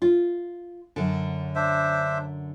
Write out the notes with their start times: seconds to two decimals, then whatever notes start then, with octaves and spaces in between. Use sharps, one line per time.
0.02 F4
0.96 F#2 D3
1.55 D4 C5 E5